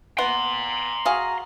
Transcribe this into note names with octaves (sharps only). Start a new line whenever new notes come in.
B3 F#5 A#5 C6
F#4 G#4 F5